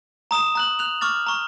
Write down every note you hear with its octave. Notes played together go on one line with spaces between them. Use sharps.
A#5 D#6 E7
A#5 F#6 F#7
F#6 F7
C#6 D6 F6 A6
A#5 C#6